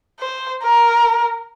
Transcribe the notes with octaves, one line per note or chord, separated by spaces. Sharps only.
C5
A#4